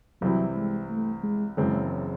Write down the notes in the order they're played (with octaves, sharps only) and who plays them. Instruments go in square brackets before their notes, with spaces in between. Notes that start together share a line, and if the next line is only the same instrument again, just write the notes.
[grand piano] C2 C3 E3 C4 E4 [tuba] F#3
[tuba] G#3
A3
G#3
[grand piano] F#1 F#2 C#3 E3 C4 [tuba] G#3